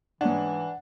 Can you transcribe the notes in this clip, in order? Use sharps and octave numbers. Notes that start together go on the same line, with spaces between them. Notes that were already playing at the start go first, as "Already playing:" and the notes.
G#2 E3 C#4 D4 F#5